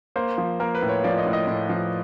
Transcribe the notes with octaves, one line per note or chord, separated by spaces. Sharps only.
A#3 C5
F3
A#3 A#4
B4
A2
C#5
F3 D5
D#5
A2
D#5
A2
F3